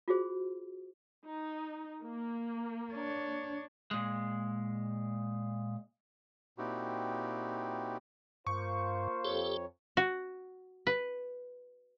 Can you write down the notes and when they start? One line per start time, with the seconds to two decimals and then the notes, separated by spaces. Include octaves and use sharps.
0.08 F4 F#4 G#4 C5
1.25 D#4
2.03 A#3
2.94 D4 C#5
3.91 A#2 G#3
6.58 A#2 C4 D#4 E4 F#4 G4
8.47 G2 A#3 F4 C5 C#6
9.25 F2 G4 A4 C#5
9.97 F#4
10.87 B4